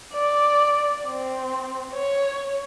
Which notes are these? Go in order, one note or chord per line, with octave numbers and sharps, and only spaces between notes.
D5
C4
C#5